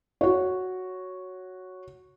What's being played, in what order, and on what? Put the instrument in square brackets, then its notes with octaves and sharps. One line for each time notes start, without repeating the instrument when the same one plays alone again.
[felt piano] F#4 C#5